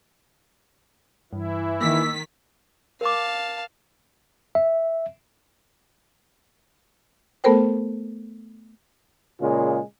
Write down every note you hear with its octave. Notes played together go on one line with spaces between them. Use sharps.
G2 E3 E4
D#3 A#3 D6 E6 B6
A#4 F5 A5 D6
E5
A3 B3 A4 A#4 C5 G5
A#2 C#3 G#3 F4